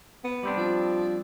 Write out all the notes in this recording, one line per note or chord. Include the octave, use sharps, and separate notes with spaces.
B3
G3 C4 D4
F3